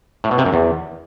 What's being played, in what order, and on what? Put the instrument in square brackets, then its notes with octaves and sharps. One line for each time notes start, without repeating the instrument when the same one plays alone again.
[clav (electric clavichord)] A2
B2
C3
F#2
E2